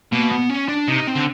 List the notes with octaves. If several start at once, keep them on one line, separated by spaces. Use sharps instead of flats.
B2 A#3
B3
C#4
D4
C3 D#4
C4
D3